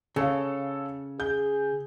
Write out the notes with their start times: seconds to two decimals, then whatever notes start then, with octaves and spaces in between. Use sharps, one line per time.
0.16 C#3 A4 C#5 F5
1.20 G#4 G6